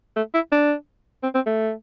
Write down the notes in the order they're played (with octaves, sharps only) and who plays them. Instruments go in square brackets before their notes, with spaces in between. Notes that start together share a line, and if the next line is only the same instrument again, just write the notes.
[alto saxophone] A3
E4
D4
C4
C4
A3